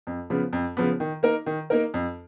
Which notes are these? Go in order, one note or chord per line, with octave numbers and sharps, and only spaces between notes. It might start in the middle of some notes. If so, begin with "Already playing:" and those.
F2
C#3 F3 B3
F2
C#3 F3 B3
D#3
A#3 D#4 A#4
D#3
A#3 D#4 A#4
F2